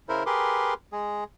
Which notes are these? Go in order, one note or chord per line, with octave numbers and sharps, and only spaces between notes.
C#3 E4 A#4 C5
G4 G#4 A#4 B4 C6 D6
G#3 G#4